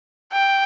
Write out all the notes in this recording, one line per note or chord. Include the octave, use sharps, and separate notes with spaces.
G5